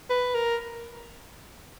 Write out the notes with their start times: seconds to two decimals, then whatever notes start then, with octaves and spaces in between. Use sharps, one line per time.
0.10 B4
0.34 A#4